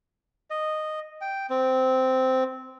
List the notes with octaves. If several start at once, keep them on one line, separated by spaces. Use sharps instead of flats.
D#5
G5
C4